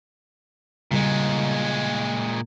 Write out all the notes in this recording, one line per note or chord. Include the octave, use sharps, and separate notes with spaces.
A#2 C#3 G3 G#3